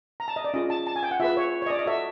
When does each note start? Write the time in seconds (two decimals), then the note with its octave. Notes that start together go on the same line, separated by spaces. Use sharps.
0.20 A#5
0.28 A5
0.36 D#5
0.44 D5
0.54 C#4 F4 G#4 D#5
0.70 A5
0.87 A5
0.96 G#5
1.03 G5
1.11 F#5
1.20 F4 G#4 B4 E5
1.37 C#5
1.62 C#5
1.66 D#5
1.70 D5
1.79 D#5
1.86 F#4 A4 C#5 E5